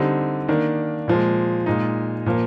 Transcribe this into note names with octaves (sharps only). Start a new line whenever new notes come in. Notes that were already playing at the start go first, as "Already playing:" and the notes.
Already playing: D3 G3 C4 D#4
D#3 A#3 D4
A#2 F3 G#3
A#2 G#3 D#4
A#2 F3 A#3